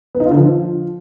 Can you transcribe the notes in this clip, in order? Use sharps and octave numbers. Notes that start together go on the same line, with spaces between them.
B3
D#4
F4
D3
F3